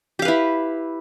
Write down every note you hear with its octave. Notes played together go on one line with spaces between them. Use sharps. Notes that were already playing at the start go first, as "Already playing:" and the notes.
E4 G4 B4 F5